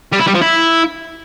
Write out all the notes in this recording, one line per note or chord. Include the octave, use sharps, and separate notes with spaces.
G3
E4
G3
F3
E4